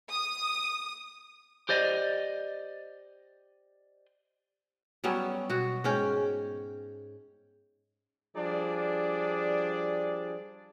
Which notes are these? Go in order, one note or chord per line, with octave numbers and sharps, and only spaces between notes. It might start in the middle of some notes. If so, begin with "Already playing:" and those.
D#6
G4 C5 D5 D#5
F#3 G3 B3 C#4
B2 F#4
G#2 C#4 G5
F3 G3 D4 G#4 D5